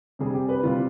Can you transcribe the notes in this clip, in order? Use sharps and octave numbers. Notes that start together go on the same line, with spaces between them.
C3 G3 G#4
G4
B4
C3 G3 F4